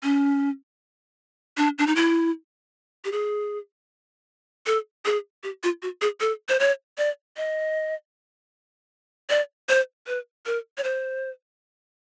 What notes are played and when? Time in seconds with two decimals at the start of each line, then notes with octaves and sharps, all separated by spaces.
0.03 C#4
1.57 D4
1.78 D4
1.87 D#4
1.96 E4
3.05 G4
3.12 G#4
4.66 A4
5.05 G#4
5.43 G4
5.63 F4
5.82 F#4
6.02 G#4
6.20 A4
6.49 C5
6.60 C#5
6.98 D5
7.37 D#5
9.30 D5
9.69 C5
10.07 B4
10.46 A#4
10.78 C#5
10.84 C5